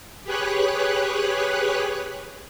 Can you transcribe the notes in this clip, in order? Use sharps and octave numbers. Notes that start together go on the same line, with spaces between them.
G4 G#4 B4 C#5 F#6